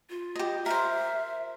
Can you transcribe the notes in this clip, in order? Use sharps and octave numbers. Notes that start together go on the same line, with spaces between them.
F4
G4 D#5
A#4 C5 E5